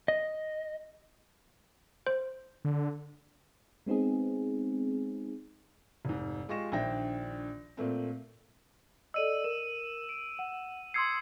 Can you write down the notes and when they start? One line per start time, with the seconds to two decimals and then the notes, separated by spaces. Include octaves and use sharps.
0.08 D#5
2.07 C5
2.65 D3
3.86 G#3 B3 C4 D#4 G#4
6.05 F1 G#2
6.49 G#3 F4 G4 C#6 A#6 E7
6.72 A#1 D#3 D4 E5 G5 A#6
7.77 A#2 A3 C4
9.14 A4 D5 D#5 E6 D#7
9.44 A#4 E7
10.09 D7
10.39 F#5
10.94 C6 D#6 E6 G#6 C7 C#7